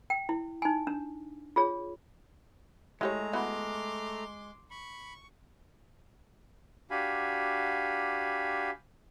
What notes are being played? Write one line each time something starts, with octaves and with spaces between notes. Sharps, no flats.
G5
E4
D#4 G#5
D4
F4 G#4 C#5
G#3 A3 E4 G4 C#5 A#5
B3 E4 F#4 C6 D6
B5 C#6
D4 F#4 G4 F5 G#5 B5